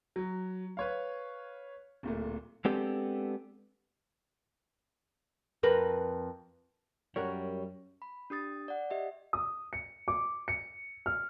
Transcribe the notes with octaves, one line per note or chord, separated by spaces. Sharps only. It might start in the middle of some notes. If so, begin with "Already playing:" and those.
F#3
B4 C#5 F5
D1 A#2 A3
G#3 B3 C4 D4 G4 A4
F2 A#4 B4
F#2 G3 A#4 C#5 F#5
B5
D4 G4 D#6 A6
D5 F#5
G4 D#5 E5
D#6
C#7
D6
C#7
F6